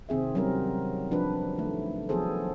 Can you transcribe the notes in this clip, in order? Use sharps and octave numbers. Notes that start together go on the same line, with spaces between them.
C3 D#3 C4 G#4 E5
F#3 G3 C4 C#4 A#4
F3 D4 F#4 B4
D#3 A3
F3 F#3 B3 G#4 A4 C5